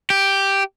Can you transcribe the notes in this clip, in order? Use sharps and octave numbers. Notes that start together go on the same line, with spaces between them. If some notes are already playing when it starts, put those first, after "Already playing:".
G4